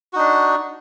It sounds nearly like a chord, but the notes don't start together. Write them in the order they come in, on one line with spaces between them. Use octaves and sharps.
F#4 D#4 D4